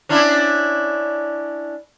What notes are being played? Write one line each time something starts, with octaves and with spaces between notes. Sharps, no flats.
C#4 D4 E4